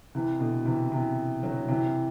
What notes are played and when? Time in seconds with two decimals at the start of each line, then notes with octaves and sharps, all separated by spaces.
0.15 C3 E3
0.40 B2 D3
0.65 C3 E3
0.92 C3 E3
1.43 D3 F#3
1.69 C3 E3